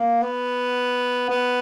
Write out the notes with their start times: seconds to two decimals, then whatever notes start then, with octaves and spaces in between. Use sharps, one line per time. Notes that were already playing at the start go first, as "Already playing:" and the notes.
Already playing: A#3
0.22 B3
1.29 B3